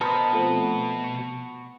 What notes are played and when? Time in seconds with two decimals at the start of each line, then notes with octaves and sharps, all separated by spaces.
0.01 B2 B3 F#4 A#4 C5 D#5 A5
0.33 F3 A3 C4
1.04 C#6